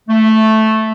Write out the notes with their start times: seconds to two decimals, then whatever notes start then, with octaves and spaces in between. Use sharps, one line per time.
0.09 A3